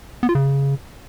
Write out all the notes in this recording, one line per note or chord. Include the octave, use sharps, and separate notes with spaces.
B3
F4
C#3